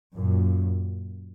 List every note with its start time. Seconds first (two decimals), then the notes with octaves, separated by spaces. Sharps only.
0.15 F#2 A#2